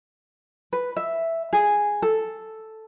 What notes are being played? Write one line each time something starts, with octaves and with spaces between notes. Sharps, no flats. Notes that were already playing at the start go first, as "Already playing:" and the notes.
B4
E5
G#4
A4